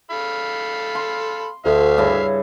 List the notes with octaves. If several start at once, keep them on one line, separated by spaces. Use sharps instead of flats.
A4 F5 B5
C6
D2 E5 F5
G2 C#3 E4